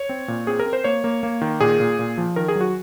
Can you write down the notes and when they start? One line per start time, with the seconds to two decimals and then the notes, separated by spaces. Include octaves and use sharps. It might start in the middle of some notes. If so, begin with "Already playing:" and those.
Already playing: C#5
0.09 C4
0.28 A#2
0.47 C4 G#4
0.60 A#4
0.66 C4
0.73 C5
0.84 A#3 C#5
1.04 A#3
1.23 A#3
1.41 D#3
1.60 A#2 G#4
1.80 A#2
1.99 A#2
2.18 F3
2.36 D#3 A#4
2.48 G#4
2.56 F#3
2.61 F#4